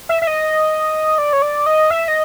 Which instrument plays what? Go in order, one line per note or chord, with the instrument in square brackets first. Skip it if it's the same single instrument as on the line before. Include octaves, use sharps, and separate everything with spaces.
[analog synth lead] E5
E5
D#5
D5
C#5
D5
D#5
E5
D#5